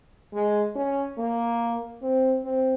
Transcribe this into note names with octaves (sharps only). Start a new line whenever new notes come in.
G#3
C#4
A#3
C4
C4